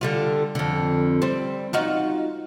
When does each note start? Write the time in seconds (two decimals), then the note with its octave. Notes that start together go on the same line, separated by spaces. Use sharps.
0.01 D3 G3 F4
0.55 F2 D3
1.22 G3 C4
1.73 D#4 F4 F#4